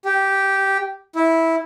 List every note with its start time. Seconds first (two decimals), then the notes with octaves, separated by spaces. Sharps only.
0.05 G4
1.15 E4